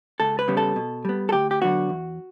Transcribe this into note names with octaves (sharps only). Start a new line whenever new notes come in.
C#2 A4
B4
C#3 G3 B3
A4
B2
G3 B3
A4
D2 G4
G4
D3 F#3 B3 F#4
E2